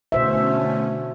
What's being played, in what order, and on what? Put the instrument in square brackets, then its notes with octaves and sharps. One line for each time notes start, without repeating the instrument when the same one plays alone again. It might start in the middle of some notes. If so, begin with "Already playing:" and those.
[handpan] B2 C5 E5 [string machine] D3 A3 C#4